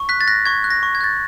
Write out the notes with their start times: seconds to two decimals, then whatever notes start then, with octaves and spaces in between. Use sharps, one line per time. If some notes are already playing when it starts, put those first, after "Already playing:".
Already playing: C#6
0.09 F#6 B6
0.21 A6
0.28 F#6 A#6
0.46 C#6 G#6
0.64 F#6
0.70 A#6
0.83 C#6
0.95 G#6
1.01 F#6 A6